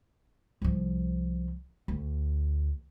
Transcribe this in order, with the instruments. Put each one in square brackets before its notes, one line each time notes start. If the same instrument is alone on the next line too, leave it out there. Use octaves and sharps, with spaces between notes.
[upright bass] C2 F3
D2